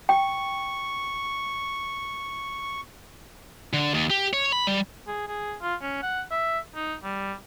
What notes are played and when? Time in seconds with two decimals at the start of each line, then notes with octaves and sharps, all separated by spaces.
0.09 G5 C#6
3.73 D3
3.94 D#2
4.10 G4
4.33 C#5
4.52 B5
4.67 G3
5.07 G#4
5.27 G#4
5.62 F4
5.82 C#4
6.02 F#5
6.31 E5
6.75 D#4
7.03 G3